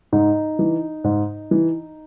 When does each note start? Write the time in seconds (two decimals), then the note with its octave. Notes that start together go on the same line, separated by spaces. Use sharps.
0.12 G#2 D#4
0.59 E3
1.04 G#2
1.51 E3